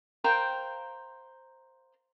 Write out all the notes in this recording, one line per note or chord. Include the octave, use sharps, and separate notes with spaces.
A#4 C5 F5 G5